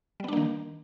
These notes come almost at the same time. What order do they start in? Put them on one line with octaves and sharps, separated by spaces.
G3 B3 D4 A#3 D#3